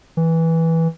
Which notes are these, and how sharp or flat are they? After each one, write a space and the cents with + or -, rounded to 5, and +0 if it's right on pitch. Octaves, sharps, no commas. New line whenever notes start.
E3 -10